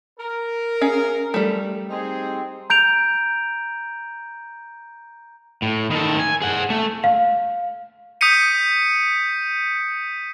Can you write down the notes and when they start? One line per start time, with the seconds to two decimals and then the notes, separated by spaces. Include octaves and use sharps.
0.18 A#4
0.81 C#4 G#4 F5
1.34 G3 A3
1.90 C4 D#4 G#4
2.70 A#5 G6 D7 F7
5.62 A2
5.91 D#3 A4
6.19 G#5
6.42 G#4 F#5
6.70 A3
7.04 F5
8.21 D#6 G6 B6 C#7 D#7